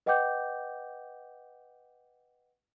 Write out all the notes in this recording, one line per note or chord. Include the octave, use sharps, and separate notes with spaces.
B4 D#5 F#5 G5 D6 G6